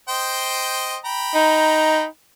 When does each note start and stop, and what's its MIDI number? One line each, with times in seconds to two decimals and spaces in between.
0.09 0.97 72
0.09 0.97 75
0.09 0.97 79
1.05 2.06 79
1.05 2.06 82
1.05 2.06 83
1.35 2.05 63